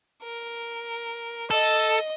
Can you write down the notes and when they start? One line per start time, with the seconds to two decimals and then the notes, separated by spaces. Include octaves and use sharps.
0.23 A#4
1.51 A4 D#5